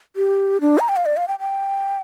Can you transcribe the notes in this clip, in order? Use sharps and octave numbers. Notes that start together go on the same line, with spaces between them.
G4
D4
A#5
G5
F5
D5
F5
G5
G5